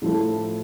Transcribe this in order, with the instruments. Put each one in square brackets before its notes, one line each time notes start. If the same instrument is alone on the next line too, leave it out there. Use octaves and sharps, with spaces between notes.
[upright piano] A2 F3 A3